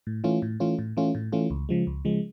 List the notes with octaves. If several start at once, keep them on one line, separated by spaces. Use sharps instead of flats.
A2
E3 A3 C#4 F4
A2
E3 A3 C#4 F4
A2
E3 A3 C#4 F4
A2
E3 A3 C#4 F4
C#2
C#3 F3 G#3
C#2
C#3 F3 G#3